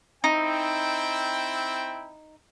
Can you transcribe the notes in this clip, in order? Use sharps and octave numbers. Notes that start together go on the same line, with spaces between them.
C4 D#4 E4 G5